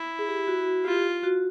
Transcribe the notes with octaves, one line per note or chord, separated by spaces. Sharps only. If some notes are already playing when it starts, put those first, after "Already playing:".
Already playing: E4
G#4
G4
F#4
F4 G4
F#4